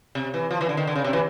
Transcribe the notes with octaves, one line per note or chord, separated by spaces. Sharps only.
C3
E3
F3
E3
D3
D#3
D3
C#3
C3
E3